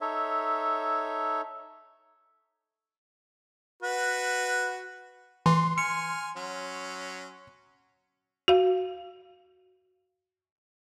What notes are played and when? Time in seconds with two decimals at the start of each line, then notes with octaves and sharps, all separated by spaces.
0.01 D#4 A4 C#5 E5
3.83 F#4 B4
5.46 E3 C6
5.78 G#5 F6 C#7
6.36 F#3 C#4
8.48 F#4 F5